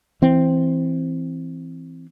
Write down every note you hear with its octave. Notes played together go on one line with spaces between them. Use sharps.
E3 C4